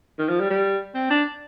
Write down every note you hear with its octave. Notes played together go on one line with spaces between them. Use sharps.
D#3
F3
G3
G3
C4
D4